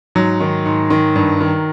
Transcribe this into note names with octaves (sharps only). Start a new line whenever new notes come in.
G#2 F#3
D#3
G#2
D#3
G2
D#3